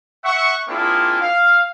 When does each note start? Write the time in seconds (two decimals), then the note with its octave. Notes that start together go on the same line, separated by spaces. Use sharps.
0.24 E5 F#5 C#6
0.68 A#3 C4 D4 E4 F4 G#4
1.22 F5